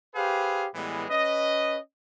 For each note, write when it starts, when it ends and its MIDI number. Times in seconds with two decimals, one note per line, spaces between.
0.15 0.67 67
0.15 0.67 68
0.15 0.67 71
0.15 0.67 72
0.15 0.67 77
0.75 1.06 45
0.75 1.06 52
0.75 1.06 55
0.75 1.06 56
0.75 1.06 59
1.09 1.78 61
1.09 1.78 71
1.09 1.78 75